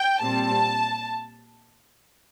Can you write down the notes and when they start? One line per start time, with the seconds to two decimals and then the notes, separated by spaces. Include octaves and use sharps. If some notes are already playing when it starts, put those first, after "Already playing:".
Already playing: G5
0.21 A#2 G3 C4 A5